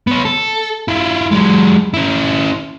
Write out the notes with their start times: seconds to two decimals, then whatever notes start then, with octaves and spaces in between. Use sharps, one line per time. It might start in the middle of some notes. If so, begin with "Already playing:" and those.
0.07 B3 C#5
0.25 A4
0.88 E4 F4
1.31 F#3 G#3
1.94 C#4 E4